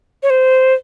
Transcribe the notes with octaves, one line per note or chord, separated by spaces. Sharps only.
C#5
C5